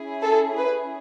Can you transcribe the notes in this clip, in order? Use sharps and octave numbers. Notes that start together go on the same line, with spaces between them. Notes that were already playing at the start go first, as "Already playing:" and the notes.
Already playing: C#4 E4 G#4
A4
B4